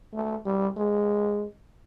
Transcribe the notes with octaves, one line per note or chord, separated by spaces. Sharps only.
A3
G3
G#3